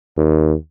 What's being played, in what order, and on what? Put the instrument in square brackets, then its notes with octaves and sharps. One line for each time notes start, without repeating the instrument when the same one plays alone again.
[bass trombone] D#2